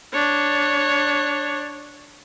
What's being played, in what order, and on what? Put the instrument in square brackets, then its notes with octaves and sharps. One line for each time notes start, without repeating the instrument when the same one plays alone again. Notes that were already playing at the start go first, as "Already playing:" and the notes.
[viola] D4 C#5